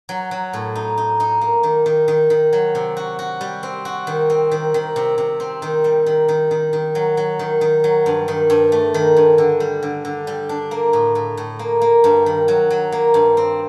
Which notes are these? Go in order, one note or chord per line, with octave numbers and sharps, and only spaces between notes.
F#3
F#3
A2
D#4
D#4
D#4
A#3
D#3
D#3
D#3
D#3
F#3
C3
F#4
F#4
G3
C4
F#4
D#3
C4
D#3
D#3
C3
C3
C4
D#3
G3
D#3
D#3
D#3
D#3
F#3
F#3
D#3
D#3
F#3
G2
D#3
G2
A3
D#3
G2
D3
G3
D3
D3
G3
D4
A#3
A2
A2
A2
A#3
A#3
G2
D#3
F#3
F#3
A#3
G2
C4